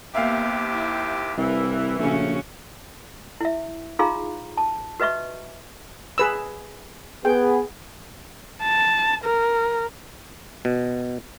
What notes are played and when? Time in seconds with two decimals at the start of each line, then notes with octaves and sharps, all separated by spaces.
0.15 D#2 C3 A#3 B3 G4 E5 F5 G5
0.72 E4
1.38 C2 E3 A#4
1.99 A#1 C#3 A3 C#4 F#4
3.41 E4 E5
3.99 D#4 F4 G#4 F5 A#5 C6
4.57 A5
5.00 F#4 B4 D#5 E5 C#6
6.18 G#4 B4 E6
7.25 B3 G#4 G5
8.62 A5
9.24 A#4
10.65 B2